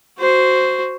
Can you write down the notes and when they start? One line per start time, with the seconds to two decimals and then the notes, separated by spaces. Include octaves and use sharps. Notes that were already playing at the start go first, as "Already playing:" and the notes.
0.18 F#4 C5